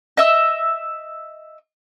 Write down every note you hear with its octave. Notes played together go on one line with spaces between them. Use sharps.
D#5 E5 E6